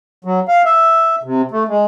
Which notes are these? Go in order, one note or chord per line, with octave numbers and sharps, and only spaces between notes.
F#3
F5
E5
C3
A3
G#3